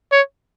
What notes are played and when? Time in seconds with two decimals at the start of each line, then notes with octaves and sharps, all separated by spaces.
0.12 C#5